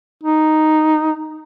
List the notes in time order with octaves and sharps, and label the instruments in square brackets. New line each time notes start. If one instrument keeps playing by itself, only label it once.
[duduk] D#4